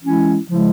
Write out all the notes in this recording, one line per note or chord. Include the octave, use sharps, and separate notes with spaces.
E3 G#3 C#4 E4
C#3 F3 G#3 E4